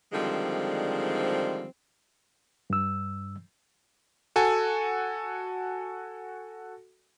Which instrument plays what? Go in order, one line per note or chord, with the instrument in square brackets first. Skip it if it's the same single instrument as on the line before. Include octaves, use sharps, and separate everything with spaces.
[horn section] D3 D#3 F3 G3 G#3 C4
[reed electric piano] G2 E6
[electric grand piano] F#4 A4 G#5